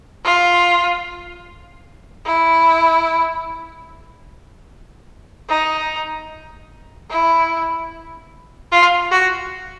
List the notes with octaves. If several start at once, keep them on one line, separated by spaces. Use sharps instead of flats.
F4
E4
D#4
E4
F4
F#4